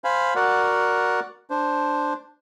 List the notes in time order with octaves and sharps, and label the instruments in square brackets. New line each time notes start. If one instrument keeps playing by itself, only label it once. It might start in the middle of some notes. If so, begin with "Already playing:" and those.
[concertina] C5 F5 G#5 B5
F#4 A#4 D5 F#5
D4 C5